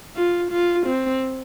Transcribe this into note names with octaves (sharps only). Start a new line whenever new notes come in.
F4
F4
C4